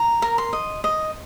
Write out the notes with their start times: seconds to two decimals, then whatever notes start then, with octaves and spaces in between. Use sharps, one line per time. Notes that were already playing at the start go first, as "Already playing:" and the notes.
Already playing: A#5
0.22 A#4
0.38 C6
0.53 D#5
0.84 D#5